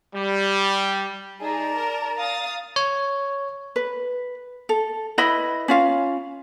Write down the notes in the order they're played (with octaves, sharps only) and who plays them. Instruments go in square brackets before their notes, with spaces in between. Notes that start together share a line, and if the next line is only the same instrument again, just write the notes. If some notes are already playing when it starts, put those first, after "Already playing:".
[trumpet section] G3
[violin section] D#4 G#4 [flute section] D5 A5 A#5
[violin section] A#4
F5 D#6 A6
[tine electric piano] C#5
[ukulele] B4
A4
E4 B4 D#5 B5
C#4 F4 F5